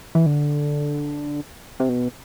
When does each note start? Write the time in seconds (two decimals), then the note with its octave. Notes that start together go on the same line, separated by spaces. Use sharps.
0.15 E3
0.26 D3
1.80 C3
1.89 B2